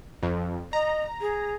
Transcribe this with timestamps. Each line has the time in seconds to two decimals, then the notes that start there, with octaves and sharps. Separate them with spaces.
0.23 F2
0.73 D#5 A#5
1.21 G#4